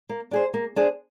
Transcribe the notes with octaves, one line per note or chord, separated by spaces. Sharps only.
A#3
D4 G#4 C5
A#3
D4 G#4 C5